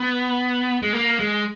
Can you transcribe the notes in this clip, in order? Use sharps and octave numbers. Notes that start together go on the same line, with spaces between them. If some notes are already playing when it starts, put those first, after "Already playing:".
Already playing: B3
G#3
A#3
G#3